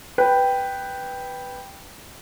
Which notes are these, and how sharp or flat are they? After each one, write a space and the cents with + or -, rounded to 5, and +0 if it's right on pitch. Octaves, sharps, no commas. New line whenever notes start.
B4 +0 G5 +0